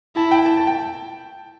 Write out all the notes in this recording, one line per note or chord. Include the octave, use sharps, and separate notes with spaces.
E4 A5
G5
A5
A5
G5